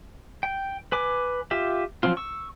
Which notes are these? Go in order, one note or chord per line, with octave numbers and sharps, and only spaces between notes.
G5
B4 G#5 D6
F4 G4 E5
F3 F#3 C4 F4
C#6 E6